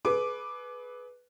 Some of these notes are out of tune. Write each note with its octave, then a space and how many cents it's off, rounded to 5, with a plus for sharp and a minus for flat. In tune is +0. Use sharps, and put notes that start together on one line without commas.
G#4 +35 B4 +0 D6 +0